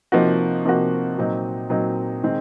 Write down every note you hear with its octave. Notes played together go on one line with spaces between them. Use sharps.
C3 F3 A#3 D#4 F#4
C3 F3 A#3 D#4 F#4
A#2 F#3 C4 D#4
A#2 F#3 C4 D#4
D#3 G#3 C4